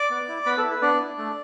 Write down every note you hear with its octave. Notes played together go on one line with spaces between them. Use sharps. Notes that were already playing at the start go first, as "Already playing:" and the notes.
Already playing: D5 D6
B3
E4
B3 B4 B5
A4
E4
B4
B3 D4 D5
E4
A3